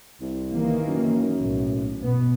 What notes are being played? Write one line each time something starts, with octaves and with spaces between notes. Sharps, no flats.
C2
D#3 E3 A#3
F#2
B1 A2
B2 B3